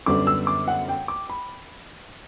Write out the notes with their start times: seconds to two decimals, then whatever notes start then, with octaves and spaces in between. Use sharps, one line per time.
0.06 F#2 D3 G3 B3 D6
0.27 E6
0.47 D6
0.68 F#5
0.88 G5
1.08 D6
1.29 B5